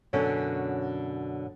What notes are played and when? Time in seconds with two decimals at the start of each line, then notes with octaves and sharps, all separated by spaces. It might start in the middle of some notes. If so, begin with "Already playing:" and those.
0.13 F#2 B2 D3 C#4